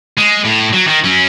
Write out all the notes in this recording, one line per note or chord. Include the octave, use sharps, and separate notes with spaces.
G#3
A2
F#3
D#3
F#3 C#4